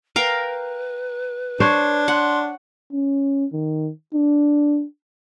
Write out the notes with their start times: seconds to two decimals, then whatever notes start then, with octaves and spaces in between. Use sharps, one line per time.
0.16 A#4 B4 F5 G5
1.60 D4 C5 C#5
2.08 F#5 C6
2.93 C#4
3.52 D#3
4.14 D4